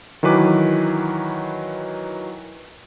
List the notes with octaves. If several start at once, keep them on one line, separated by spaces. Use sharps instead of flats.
D#3 E3 F#3 B4 D6